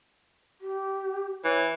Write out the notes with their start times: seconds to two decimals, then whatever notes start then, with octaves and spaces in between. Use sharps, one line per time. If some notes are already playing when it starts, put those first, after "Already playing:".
0.61 G4
1.44 E3 C#5